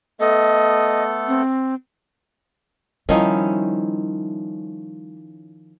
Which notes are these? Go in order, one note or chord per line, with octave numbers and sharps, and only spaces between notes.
A3 B3 A4 D#5
C4
D#3 F3 G3 C#4 D#4 E4